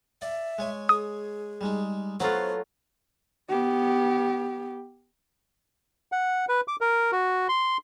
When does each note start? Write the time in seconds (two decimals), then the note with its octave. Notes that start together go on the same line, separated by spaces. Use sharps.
0.22 D5 E5
0.58 G#3 C#5 G#5
0.89 G#4 D#6
1.61 G3 G#3 D#4
2.20 F#3 A3 B3 F4 C5
3.49 B3 G4
6.12 F#5
6.49 B4
6.68 D6
6.81 A#4
7.12 F#4
7.49 C6